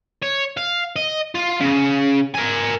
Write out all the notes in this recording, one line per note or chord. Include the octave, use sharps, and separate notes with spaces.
C#5
F5
D#5
F4
C#3
A#4 G#5